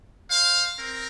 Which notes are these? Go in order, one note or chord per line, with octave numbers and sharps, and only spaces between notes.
C5 F5
C4 A#4